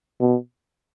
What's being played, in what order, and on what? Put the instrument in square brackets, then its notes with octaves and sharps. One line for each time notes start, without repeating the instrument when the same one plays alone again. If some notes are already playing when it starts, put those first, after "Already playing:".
[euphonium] B2